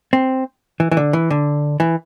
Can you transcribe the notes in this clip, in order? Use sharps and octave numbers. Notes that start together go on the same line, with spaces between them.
C4
E3
E3
D3
E3
D3
E3